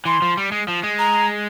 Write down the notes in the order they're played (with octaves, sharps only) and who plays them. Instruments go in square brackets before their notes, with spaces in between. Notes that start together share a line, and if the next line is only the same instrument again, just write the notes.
[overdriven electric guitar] E3 [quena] C6
[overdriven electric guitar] F3
G3
G#3
F3
G#3
[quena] A#5